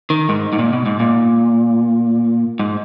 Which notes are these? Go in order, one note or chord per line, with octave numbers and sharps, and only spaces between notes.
D#3
G#2
G#2
A#2
B2
G#2
A#2
G#2